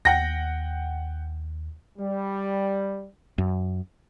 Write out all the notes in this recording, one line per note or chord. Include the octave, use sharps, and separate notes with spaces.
D#2 F#5 G5 A#6
G3
F#2